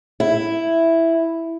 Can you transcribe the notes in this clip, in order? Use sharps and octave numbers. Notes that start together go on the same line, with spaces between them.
E4